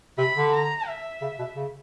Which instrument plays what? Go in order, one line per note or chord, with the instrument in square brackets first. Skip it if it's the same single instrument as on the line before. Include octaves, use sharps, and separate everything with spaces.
[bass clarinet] C3 [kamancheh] B5
[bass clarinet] D3
[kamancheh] A#5
E5
[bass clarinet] C#3
B2
C#3